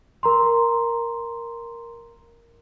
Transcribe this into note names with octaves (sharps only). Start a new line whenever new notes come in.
A#4 A#5 C6